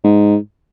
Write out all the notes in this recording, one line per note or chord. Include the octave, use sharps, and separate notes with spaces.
G#2